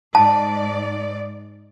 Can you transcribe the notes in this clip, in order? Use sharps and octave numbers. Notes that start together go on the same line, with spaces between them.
G#2 D5 A5